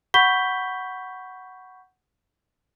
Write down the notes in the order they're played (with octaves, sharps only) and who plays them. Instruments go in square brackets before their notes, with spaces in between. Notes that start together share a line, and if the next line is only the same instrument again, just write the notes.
[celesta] F#5 B5 C#6 G6 B6 G7